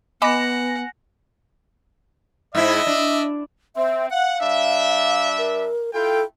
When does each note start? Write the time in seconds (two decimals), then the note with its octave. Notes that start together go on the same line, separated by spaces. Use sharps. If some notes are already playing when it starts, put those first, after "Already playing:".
0.22 B3 D#5 F#5 G#5 B5 D6 A#6
2.55 G#2 E4 D#5 E5
2.87 D4
3.76 C4 E5
4.11 F5 F#5
4.40 G3 D4 E5
5.38 A#4
5.94 E4 F4 A4 G5